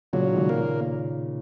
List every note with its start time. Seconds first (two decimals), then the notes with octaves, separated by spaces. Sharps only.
0.13 A#2 C#3 F#3
0.29 D#3
0.37 A#2 C#3
0.49 A#3